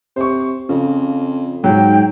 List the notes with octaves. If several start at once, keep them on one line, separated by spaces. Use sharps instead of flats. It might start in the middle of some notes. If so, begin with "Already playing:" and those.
C3 C5 C#6
F2 C#3
G#2 F#3 G5